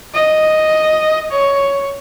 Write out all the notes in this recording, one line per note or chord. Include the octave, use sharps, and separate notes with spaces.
D#5
C#5